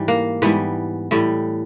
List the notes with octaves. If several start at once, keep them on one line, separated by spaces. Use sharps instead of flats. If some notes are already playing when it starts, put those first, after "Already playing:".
Already playing: G#2 E3 G3
A#3
G#2 E3 G3 B3
A2 E3 G3